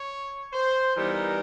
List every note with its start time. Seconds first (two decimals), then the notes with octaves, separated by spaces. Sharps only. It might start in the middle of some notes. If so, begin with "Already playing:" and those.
Already playing: C#5
0.53 C5
0.95 E3 G3 B3 D#4 A#4